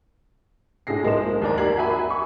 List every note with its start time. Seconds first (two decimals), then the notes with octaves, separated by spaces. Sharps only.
0.87 A2 D4 G#4 A#6 C7
1.04 B1 G#3 A#3 D#4 C5 E7
1.42 D#2 A#4 D5 A#5
1.58 A#3 G4 A#5 G#6 C7 F#7
1.77 F#4 E5 G#5 B5
2.10 C#6